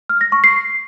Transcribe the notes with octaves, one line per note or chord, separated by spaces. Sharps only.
F6
A#6
C#6
C7